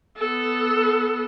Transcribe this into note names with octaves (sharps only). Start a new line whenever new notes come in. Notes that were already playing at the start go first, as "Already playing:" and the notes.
B3 A4